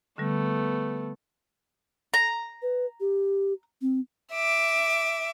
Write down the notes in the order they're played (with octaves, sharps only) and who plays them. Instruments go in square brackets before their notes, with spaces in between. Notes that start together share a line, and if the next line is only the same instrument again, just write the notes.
[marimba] D3 G3 [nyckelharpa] A3 B3
[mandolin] A#5
[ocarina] B4
G4
C4
[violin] E5 D6